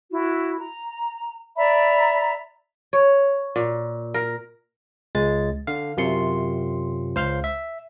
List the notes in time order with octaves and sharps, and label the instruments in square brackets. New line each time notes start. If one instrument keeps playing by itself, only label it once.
[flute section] E4 F#4
A#5
D5 E5 A#5 B5
[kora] C#5
A#2
A#4
[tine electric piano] C#2 G#3 A6
D3 F5
F#2 C3 F4 C6 C#7
C#2 C5 F5 F6 G6
E5